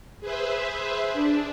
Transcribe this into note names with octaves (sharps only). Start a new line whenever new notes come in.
G#4 B4 C5 E5
D4